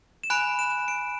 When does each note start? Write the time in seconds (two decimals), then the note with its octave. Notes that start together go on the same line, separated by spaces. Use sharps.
0.23 E7
0.30 G#5 B5 F#6 D7
0.59 E7
0.88 D7